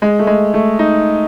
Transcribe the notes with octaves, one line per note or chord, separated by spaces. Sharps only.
G#3
A3
G#3
A3
D#4